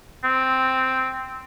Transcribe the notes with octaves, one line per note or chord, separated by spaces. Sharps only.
C4